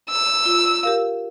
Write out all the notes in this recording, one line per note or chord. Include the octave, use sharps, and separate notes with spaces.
E6
F4
G4 A#4 F5